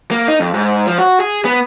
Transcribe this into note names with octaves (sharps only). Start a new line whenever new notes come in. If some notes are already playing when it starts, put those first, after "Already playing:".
A#3
D#4
F2
G#2
F3
F#4
G#4
B3